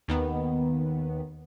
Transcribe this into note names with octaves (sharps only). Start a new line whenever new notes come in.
D#2 D#3 B3